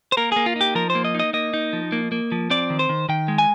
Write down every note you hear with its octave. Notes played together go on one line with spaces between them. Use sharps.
C5
A#3 A#4
A#3 G#4
F4
D#4 G4
F3 A#4
C5
A#3
D#5
D#4 D#5
A#3 D#5
D#4
F3
A#3
A#3
F3
C4 D5
D#3
C5
D#3
D#3 G5
G#3
G#5